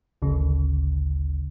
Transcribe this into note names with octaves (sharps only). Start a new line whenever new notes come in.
G#1 D2 C#3